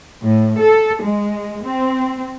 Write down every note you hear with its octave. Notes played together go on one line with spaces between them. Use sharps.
A2
A4
G#3
C4